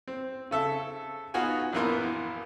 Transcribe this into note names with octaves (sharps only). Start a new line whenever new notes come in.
C4
C#3 A4 E5
B3 D#4 F4 F#4 G#5
A#1 F#2 E3 B3 A#4 C6